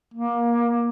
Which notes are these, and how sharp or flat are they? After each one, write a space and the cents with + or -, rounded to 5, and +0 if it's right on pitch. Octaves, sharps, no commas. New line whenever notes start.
A#3 +20